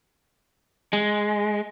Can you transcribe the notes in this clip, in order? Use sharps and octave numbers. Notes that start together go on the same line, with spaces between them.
G#3